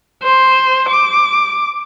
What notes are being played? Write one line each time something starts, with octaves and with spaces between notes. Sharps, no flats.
C5
D6